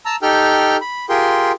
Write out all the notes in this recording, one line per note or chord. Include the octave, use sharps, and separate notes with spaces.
A5 A#5 E6
D#4 G4 A4 G5 F6 G6
B5
F4 G4 G#4 A#4 G5 C6